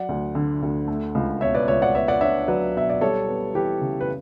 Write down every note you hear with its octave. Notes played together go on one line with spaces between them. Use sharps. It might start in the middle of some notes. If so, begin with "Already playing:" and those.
Already playing: F#3 D5 F#5
D2
D3
D2
A3
C#2
B2 C#5 E5
B4 D5
C#2 C#5 E5
D5 F#5
B3 C#5 E5
D5 F#5
D4 C#5 E5
F#3 B4 D5
B2 E5
D5
G3 A4 C#5
B3
E3 G4 B4
C#3
B4